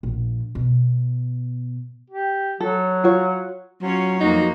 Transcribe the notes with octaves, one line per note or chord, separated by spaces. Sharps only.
A#1
B2
G4
F#3 A4
F4 F#4 C#5
F#3 C#4 F4 C#5
F2 A#3 D#4 F#4